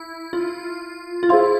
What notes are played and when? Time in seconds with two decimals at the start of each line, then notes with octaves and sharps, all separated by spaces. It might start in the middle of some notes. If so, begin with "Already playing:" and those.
Already playing: E4
0.33 F4
1.23 F4
1.29 E4 G#4 C5 F5 C6